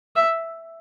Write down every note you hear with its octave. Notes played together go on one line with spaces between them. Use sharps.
E5